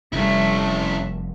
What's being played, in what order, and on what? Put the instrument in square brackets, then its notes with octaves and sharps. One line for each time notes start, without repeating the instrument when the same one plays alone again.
[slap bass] F1 F#2 C3 [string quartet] G3 A3 [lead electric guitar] C#4 E4 [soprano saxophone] E5